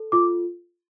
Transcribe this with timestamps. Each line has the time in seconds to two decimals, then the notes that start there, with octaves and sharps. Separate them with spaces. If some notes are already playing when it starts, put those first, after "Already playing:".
Already playing: A4
0.12 F4 D6